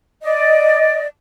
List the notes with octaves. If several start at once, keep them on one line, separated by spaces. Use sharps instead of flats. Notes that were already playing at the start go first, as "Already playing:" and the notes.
D5 D#5